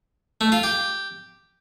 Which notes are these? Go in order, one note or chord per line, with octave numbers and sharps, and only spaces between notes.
A3
F4
G4